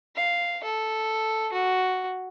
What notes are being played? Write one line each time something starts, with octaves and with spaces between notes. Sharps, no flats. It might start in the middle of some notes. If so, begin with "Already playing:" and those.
F5
A4
F#4